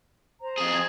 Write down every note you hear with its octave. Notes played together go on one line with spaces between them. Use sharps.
C5 A#5
F2 G#4
G#6